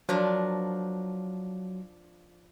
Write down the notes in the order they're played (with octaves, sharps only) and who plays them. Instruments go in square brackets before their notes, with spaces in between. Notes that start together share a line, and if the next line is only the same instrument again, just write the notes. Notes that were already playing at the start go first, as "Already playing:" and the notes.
[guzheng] F3 D4 A#4 [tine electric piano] F#3